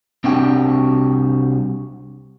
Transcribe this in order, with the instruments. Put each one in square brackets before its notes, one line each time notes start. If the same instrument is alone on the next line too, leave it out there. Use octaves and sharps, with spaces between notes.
[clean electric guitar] C2 C4 D4 F#4 G4 G5